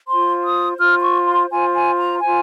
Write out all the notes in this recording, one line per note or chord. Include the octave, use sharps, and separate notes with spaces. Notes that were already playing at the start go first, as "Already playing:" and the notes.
F4 C5 C6
D#6
F4 C5 F6
C6
C#6
C6
F4 C5 G#5
G#5
A#5
F4 C5 G#5